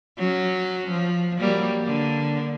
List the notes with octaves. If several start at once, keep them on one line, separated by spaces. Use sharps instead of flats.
F#3 C#4
F3
F#3 G3 A#3
D3 A#3